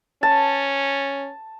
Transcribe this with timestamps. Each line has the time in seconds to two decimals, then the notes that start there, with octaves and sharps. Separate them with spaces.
0.23 C#4 A5